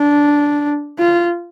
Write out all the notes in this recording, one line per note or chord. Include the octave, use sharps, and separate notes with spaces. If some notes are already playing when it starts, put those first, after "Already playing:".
Already playing: D4
F4